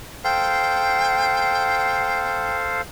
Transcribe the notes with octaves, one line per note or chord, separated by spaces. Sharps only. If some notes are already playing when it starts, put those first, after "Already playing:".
A4 C5 F5 G5